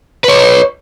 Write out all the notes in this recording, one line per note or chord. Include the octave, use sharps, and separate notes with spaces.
B4 C#5